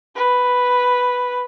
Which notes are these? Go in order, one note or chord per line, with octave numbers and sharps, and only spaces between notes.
B4